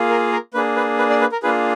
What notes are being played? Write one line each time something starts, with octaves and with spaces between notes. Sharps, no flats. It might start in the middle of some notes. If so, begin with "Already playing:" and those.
Already playing: A#3 F4 G#4
A#4
A#4
A#3 D4 G#4 B4
B4
B4
D5
B4
A#4
A#3 D4 F4 G#4 B4